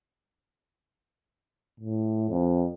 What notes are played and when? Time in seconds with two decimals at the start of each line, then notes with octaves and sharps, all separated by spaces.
1.80 A2
2.29 F2